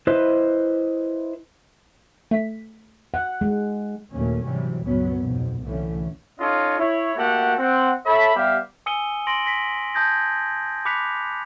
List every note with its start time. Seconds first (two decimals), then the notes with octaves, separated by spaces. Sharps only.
0.07 E4 B4 C5 D#5
2.31 A3 B6
3.14 F#5
3.41 G#3
4.13 D#2 A#2 F#3 A3 A#3 C#4
4.44 G#2 C3 E3 F#3 G3
4.83 C#2 G2 A#2 F#3 B3 C#4
5.20 F2 G#2 B2
5.62 C2 A2 D3 E3 A3 C#4
6.39 C#4 D#4 F4 A4 C#5 D#5
6.79 E4 C#5
7.16 A3 A#3 F#4 G4 A4 F#5
7.59 C4 F#5
8.06 A4 C#5 E5 A5 B5
8.36 G3 B3 G4 E5 F5
8.86 G#5 D#6 E6 C#7 D#7 G7
9.27 C6 A#6 D7 F#7
9.46 A#6 B6
9.94 A5 D#6 G6 G#6 A#6
10.85 B5 D6 F#6 B6 C#7 F7